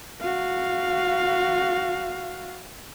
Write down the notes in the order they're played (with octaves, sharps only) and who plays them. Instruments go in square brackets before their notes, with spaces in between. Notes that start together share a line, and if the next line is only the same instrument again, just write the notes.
[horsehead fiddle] F#4 F5